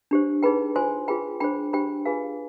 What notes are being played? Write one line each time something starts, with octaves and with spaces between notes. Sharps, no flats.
D4 G4 C5
D#4 G#4 B4 G5 B5
F4 C5 G#5 C6
F4 G#4 B4 G5 B5
D4 G#4 C5 G5 B5
D4 G4 C5 G5 B5
F4 G#4 B4 F5 G#5